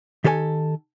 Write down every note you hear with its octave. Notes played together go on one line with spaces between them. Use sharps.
D#3 G4 A4 C5 G#5